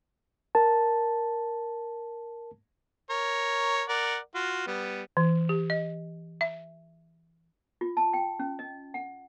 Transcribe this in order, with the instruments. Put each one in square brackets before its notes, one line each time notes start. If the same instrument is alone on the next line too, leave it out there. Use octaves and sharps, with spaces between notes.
[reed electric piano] A#4 A5
[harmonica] A#4 C#5
A#4 D5 F#5
F4 F#4
G3 B3
[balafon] E3
G4
D#5
E5
[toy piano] F4
A5
G5
C#4
D#5
F#5